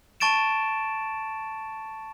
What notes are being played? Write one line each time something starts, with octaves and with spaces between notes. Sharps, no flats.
A5 C#6 A6 D7 E7